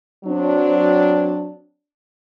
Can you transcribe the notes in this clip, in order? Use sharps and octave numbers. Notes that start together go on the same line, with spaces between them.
F#3 C4 D4